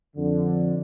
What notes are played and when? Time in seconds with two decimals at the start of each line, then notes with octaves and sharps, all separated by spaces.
0.16 F2 D3